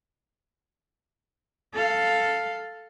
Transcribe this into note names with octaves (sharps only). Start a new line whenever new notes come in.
A4 F5